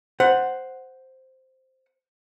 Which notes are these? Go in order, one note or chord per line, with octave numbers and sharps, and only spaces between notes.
C5 F#5